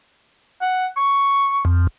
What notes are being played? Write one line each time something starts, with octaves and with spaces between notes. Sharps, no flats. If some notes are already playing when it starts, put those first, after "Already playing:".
F#5
C#6
F2